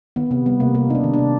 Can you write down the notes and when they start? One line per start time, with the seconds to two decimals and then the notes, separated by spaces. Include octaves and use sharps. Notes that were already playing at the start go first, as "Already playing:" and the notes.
0.16 D#3 B3
0.31 C3 B3
0.46 G3 B3
0.60 C3 A#3
0.75 C3 A#3
0.89 C3 D#4
0.95 D4
1.04 D#3
1.14 D4
1.19 C3